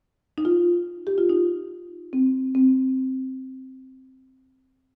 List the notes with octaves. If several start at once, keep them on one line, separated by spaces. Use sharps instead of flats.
D#4
F4
G4
F4
D#4
C4
C4